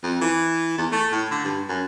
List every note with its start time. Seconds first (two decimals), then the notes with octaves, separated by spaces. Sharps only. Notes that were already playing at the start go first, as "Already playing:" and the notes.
0.04 F2
0.21 E3
0.78 E2
0.92 A3
1.12 A2
1.31 D3
1.45 G2
1.69 F#2